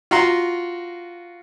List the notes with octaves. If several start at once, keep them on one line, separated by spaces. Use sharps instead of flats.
F4 F#4 A#5 C6